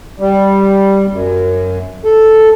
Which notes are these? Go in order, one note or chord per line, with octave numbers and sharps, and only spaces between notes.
G3
F#2
A4